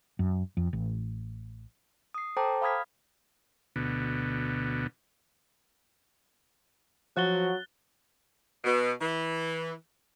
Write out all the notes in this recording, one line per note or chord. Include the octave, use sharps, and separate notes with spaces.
F#2
F2
A1
D#6 C7
A4 C5 G5 A5 A#5 D6
F5 B5 D#6 F6 G#6 B6
D2 B2
F3 F#3 F#4 F#6 A6 G7
B2
E3